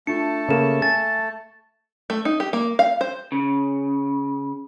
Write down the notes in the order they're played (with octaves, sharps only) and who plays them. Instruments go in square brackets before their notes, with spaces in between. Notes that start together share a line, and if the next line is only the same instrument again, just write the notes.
[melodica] A3 A5 [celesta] D4 F4 [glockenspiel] C#7
[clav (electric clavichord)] C#3 A#3 [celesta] A4 E7
[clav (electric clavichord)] G#5 [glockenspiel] A6
[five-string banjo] A3
D#4
G4
A#3
F5
C5
[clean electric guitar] C#3